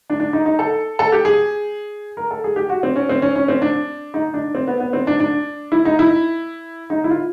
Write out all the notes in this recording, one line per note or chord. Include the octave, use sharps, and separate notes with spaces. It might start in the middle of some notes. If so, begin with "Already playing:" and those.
D4
D4
D#4
D#4
A4
A4
G4
G#4
A#4
A4
G#4
G4
F#4
C4
C#4
C4
C#4
C#4
C4
D4
D#4
D4
C4
B3
B3
C4
D4
D4
E4
D#4
E4
D#4
E4
F4